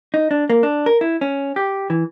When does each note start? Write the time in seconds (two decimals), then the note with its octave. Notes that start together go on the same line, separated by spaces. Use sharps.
0.14 D#4
0.31 D4
0.50 A#3
0.63 D4
0.86 A#4
1.01 E4
1.21 C#4
1.56 G4
1.90 E3